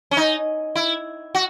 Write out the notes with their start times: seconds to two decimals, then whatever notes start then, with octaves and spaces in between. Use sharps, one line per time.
0.11 C#4
0.17 D#4
0.75 E4
1.35 F#4